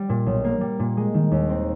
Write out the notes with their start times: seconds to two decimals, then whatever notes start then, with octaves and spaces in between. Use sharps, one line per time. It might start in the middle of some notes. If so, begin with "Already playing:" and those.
Already playing: G3
0.09 A#2
0.26 B1
0.44 A#3
0.61 G3
0.79 A#2
0.97 G#3
1.14 D#3
1.31 D#2
1.49 C4